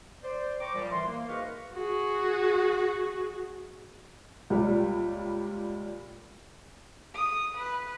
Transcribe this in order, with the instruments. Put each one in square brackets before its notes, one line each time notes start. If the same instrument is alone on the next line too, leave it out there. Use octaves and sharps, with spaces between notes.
[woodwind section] C5 D5
C5 G5 A#5 C#6 D6
A#2 F3 G3
E3 C6
A#3
G#2 F#4 A#4 B4 F5 C#6
[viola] F#4 G#4
[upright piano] C#2 A#2 G3
[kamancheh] D#6
B4